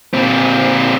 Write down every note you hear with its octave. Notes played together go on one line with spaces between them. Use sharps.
A#2 C4